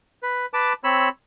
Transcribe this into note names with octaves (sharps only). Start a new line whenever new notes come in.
B4
B4 A5 D6
C4 C#5 B5 E6